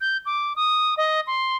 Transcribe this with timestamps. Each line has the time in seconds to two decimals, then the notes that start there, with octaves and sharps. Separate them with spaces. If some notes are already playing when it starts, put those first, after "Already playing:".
0.01 G6
0.26 D6
0.56 D#6
0.97 D#5
1.27 C6